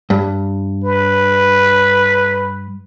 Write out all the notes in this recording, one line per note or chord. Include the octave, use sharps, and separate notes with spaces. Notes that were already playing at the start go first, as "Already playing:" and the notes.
G2
B4